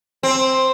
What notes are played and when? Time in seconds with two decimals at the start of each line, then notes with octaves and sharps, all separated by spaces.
0.23 C4